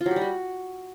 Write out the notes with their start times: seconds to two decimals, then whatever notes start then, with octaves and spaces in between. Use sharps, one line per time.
0.01 F4
0.06 F#3
0.11 G4
0.16 G3
0.21 F#4